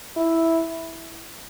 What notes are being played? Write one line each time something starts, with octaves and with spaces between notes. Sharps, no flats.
E4